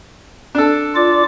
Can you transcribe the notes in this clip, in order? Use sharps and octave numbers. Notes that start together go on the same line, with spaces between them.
D4 A4
F4 D5 D6